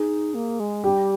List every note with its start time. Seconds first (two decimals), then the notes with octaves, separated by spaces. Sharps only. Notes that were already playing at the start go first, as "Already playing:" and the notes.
Already playing: D#4 G#4
0.34 A#3
0.60 G#3
0.84 G3 G4